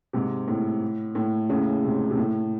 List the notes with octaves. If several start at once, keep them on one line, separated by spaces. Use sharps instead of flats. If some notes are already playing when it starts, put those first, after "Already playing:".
G#2 C3
A2
A2
A2 C#3
G#2 C3
C3
A2